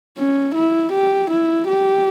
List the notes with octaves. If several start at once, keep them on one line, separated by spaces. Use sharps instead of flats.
C#4
E4
G4
E4
G4